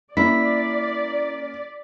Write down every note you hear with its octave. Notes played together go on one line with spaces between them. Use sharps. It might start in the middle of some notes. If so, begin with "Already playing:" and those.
A#3 C#4 D4 E4 D5 B6